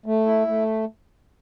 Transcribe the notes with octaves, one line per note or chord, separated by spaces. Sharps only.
A3
E4
A3